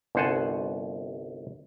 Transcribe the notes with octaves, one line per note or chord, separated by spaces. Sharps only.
G1 C2 C5 F#5 G#5 A5